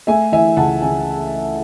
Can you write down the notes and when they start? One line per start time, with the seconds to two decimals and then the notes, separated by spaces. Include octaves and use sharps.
0.07 A3 E5 G#5
0.32 E3 E5 G#5
0.57 C#2 F#5 A5
0.82 C#3 G#5